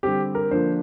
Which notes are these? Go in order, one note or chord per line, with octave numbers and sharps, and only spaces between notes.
D3 G3 C4 G4
A#4
D3 F3 A#3 D4 C5